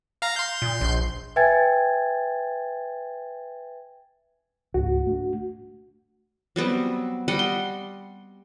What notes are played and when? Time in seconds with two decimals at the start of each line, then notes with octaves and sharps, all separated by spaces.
0.22 F5 A#5
0.36 C6 G6
0.62 A#2
0.81 A#1
1.36 B4 E5 G5 G#5 G#6 A6
4.74 C#2 G#2 F#4
5.07 A3 D4
6.56 F#3 G3 B3 C4
7.28 G3 D#5 F#5 B5
7.39 C6